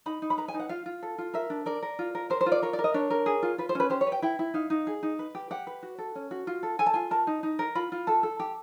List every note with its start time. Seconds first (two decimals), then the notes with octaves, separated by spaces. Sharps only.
0.06 D#4 B5
0.22 D#4
0.30 B5
0.37 B4 A#5
0.48 G#5
0.54 D#4
0.59 F#5
0.69 F4 F5
0.86 F4
1.03 A4
1.18 F4
1.34 A#4 E5
1.50 D4
1.66 A#4 D5
1.82 A#4
1.99 F4
2.15 A#4
2.30 A#4 C5
2.41 C5
2.46 F4
2.52 D5
2.62 A#4 C#5
2.73 D5
2.79 A#4
2.84 D#5
2.94 D4 C#5
3.10 A#4
3.26 G#4
3.43 F4
3.58 F4 B4
3.69 C5
3.75 C#4 B4
3.90 G4 C5
4.01 C#5
4.07 B4
4.12 G5
4.22 E4 G5
4.39 E4
4.54 D#4 F5
4.70 D#4
4.87 G#4
5.03 D#4
5.19 B4
5.35 G4
5.51 G4 F#5
5.67 B4
5.83 F#4
5.98 A4
6.15 C#4
6.31 F#4
6.47 F4
6.63 A4
6.79 A4 G#5
6.86 A5
6.94 F4 G#5
7.11 A#4 A5
7.27 D#4
7.43 D#4
7.59 A#4
7.75 F4 B5
7.92 F4
8.07 A4 A5
8.23 A4
8.40 G4